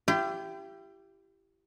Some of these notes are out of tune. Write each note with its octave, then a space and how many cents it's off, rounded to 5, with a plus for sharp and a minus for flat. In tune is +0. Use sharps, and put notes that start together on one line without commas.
E4 +40 G4 -5